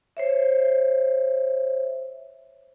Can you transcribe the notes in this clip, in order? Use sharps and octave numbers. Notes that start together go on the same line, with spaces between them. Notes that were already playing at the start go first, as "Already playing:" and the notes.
C5 C#5 E5